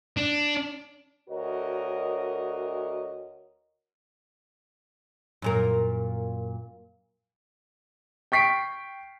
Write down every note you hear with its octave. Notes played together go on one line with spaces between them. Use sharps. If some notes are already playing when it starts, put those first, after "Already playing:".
D4
D2 F#4 A#4 C#5 D#5
F#2 A#2 A#4
G5 C#6 B6 C7 D7